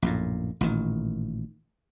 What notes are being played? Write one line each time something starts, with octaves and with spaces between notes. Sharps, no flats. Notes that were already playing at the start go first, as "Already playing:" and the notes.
A#1 F#2 A2
A1 A#2 D#3